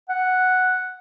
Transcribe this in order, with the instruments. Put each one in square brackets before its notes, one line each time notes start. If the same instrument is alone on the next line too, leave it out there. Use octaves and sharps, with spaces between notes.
[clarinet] F#5